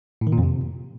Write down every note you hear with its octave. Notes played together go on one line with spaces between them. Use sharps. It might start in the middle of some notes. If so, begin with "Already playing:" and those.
A2
D#3
A#2
F2
C3